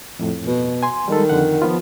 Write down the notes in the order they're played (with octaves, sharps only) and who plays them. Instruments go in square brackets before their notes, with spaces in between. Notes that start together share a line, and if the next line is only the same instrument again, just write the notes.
[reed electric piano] F2 A2
[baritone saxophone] B2
[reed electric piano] G#5 C6
[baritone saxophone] D#3 [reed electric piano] G3 G#3 A4
[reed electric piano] F2 D3 F#5
F3 B3 F4